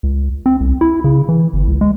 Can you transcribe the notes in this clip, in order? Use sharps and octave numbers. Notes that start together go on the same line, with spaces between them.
C#2
C4
C2
E4
C#3
E3
G1
C#2
G#3